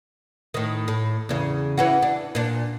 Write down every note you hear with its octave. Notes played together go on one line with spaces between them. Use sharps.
A2 D#3
A2
E2 C#3
E3 C#4 F#4
D4
A#2 D4